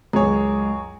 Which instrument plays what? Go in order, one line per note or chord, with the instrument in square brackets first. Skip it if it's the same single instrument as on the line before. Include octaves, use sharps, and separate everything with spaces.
[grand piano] C#2 F#2 [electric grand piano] G#4 C#5 [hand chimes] G#5 A#5